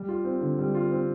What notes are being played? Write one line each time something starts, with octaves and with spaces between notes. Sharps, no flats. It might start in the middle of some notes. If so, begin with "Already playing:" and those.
Already playing: G3
F4
C4
D3
G3
F4
C4